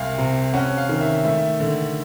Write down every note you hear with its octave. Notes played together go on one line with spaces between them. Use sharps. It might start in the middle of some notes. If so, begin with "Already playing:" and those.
Already playing: C2 F5
C3
C#4 F#5
F5
D#3
E5
A3 E5
D3